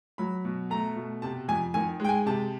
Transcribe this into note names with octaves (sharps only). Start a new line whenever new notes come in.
F#3 B5
B2
A3 A#5
B2
C3 A5
F2 G#5
D#3 G#5
G#3 G5
G#5
C3 A5